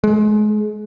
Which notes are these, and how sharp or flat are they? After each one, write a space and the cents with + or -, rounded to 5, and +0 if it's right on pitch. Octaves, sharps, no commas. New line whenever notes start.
G#3 +35